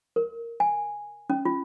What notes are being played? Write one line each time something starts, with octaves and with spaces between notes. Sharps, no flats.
A#4
G#5
C#4
F4